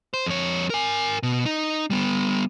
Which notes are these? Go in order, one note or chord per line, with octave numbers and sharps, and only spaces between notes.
C5
F2 C#5
A#4 G#5
B2
D#4
G3 B3